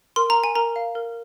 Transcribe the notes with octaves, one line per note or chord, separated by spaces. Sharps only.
A#4 C6
A#5
A#4
G#5
A#4 A#5
F5
A#4